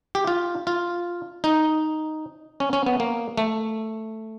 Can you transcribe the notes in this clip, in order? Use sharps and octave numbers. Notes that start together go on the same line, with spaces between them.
G4
F4
F4
D#4
C#4
C#4
B3
A#3
A3